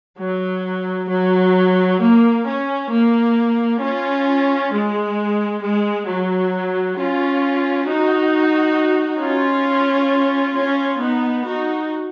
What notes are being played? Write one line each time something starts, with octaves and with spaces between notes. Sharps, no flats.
F#3
F#3
A#3
C#4
A#3
C#4 F4
G#3
G#3
F#3
C#4 F4
D#4 F#4
C#4 F4
C#4 F4
B3 D#4
D#4 F#4